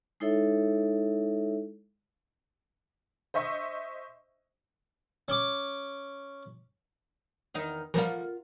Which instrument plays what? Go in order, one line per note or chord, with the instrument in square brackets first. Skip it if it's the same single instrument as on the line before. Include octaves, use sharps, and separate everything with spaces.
[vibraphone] G#3 D#4 E4 A4 C#5 E5
[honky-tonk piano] C5 D#5 E5 C#6
[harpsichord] C#4 D6
[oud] E2 D#3 D#4
[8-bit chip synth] E3 F3 G3 [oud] F4 A#4